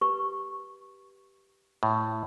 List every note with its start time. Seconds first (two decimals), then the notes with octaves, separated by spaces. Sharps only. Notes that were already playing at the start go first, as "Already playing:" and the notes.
0.01 G4 B4 C#6
1.83 A2